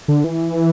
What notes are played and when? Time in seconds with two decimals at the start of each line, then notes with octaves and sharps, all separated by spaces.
0.08 D3
0.24 E3